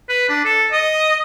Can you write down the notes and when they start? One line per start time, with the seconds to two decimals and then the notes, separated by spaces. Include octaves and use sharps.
0.09 B4
0.29 D4
0.45 A4
0.72 D#5